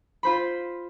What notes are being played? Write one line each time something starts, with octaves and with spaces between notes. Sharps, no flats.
F4 C5 B5